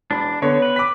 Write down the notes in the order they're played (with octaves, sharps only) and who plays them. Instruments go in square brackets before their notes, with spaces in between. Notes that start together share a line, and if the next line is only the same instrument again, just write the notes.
[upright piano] E1 B5 [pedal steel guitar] D4
[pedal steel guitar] D3 [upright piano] B3 C#5
[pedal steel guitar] B4
[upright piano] D6 B6